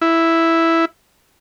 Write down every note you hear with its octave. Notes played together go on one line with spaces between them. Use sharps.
E4